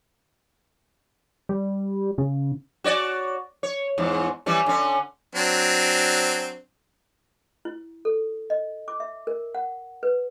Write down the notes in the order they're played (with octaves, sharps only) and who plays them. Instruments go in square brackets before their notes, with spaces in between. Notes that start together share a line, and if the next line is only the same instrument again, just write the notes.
[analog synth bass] G3
C#3
[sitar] F#4 C#5 D5
C#5
E2 G#2
E3 G3 C#4
D3 C#4
[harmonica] F#3 C4 D4
[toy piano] E4
A4
D#5
D6
E5
A#4
F#5
B4